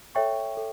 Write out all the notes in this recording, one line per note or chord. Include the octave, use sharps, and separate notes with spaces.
A4 C#5 E5 G5 C#6
A4